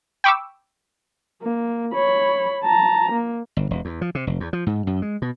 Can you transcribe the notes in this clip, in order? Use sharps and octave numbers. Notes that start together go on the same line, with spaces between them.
G5 B5 C#6 D6 E6
A#3
C#5 B5
A5 A#5
A#3
G1
E1
E2
F3
C3
F1
E2
F3
G#2
F#2
G#3
B2